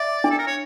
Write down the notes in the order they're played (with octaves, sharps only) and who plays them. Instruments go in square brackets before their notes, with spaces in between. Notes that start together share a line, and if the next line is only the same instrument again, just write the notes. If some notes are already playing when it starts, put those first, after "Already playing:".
Already playing: [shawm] D5 [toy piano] E5
[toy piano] D4
[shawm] A4
A#4
C#5